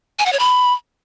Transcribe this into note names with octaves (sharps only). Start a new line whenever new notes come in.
G#5
F#5
C#5
B5